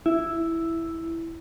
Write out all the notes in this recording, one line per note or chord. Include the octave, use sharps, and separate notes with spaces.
E4